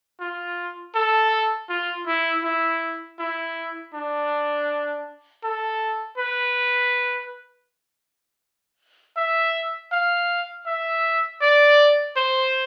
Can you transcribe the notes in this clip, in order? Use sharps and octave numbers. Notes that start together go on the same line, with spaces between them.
F4
A4
F4
E4
E4
E4
D4
A4
B4
E5
F5
E5
D5
C5